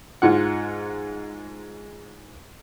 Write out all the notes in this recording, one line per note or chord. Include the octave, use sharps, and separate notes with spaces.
G#2 F4 F#5